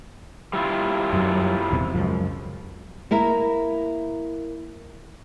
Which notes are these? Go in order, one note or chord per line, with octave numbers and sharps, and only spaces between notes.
G3 E4 F4
F#2 F#3
D#1 E2 C3
C#2 F#2 F3
A#3 E4 A#4